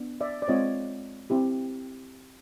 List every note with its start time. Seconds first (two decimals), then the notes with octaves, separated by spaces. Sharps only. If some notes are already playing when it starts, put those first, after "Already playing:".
Already playing: B3 D4
0.21 D5 E5
0.42 D5
0.48 G#3 C4 F4 C#5 D#5
1.30 C4 E4 G4